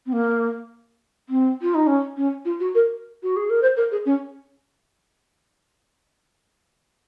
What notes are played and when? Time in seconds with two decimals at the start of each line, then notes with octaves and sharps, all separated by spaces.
0.06 C4
0.13 A#3
1.29 C4
1.62 F4
1.75 D#4
1.87 C#4
2.17 C#4
2.45 F4
2.60 F#4
2.75 A#4
3.23 F#4
3.36 G#4
3.50 A#4
3.62 C5
3.77 A#4
3.92 G#4
4.06 C#4